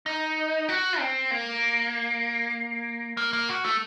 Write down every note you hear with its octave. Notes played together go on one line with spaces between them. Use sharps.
D#4
F#4
C4
A#3
A#3
A#3
F#4
A3